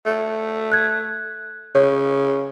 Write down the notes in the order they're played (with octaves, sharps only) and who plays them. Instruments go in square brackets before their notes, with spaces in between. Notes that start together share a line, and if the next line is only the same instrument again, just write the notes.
[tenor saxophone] A3
[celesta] F#6 G#6
[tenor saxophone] C#3 [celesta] C#5